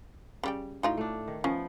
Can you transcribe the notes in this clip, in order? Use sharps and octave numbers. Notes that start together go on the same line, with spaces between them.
C#3 G3 G5
A2 D#4 F4 F#4 G5
A3 D4
D#3
F3 B3 C#4